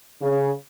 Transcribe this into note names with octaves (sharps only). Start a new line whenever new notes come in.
C#3